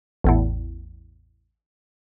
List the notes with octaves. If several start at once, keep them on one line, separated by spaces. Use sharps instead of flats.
A1 E2 A2